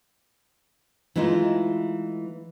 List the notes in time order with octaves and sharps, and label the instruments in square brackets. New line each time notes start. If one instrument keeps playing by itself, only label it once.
[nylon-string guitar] E3 G#3 A3 D#4 F4